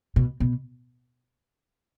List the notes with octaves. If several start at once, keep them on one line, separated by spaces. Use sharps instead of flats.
B2
B2